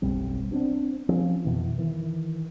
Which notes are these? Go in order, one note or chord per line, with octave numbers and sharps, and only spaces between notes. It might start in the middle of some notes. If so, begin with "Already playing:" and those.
F#1 B1 G3 C4
B3 C4 D4
F3 C4 C#4
F2 B2 E3
D#3 E3